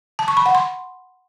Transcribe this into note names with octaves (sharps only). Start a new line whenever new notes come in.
A5
C#6
B5
F#5
C6